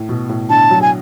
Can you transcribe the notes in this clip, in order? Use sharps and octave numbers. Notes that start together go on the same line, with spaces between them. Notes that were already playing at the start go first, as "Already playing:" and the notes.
Already playing: A2
B2
A2
D3 A5
F#3
G#5